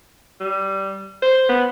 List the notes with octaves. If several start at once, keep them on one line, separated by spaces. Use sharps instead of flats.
G3
C5
B3